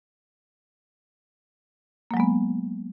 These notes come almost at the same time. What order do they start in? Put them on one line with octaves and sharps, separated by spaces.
A#3 F#3 G#3 B3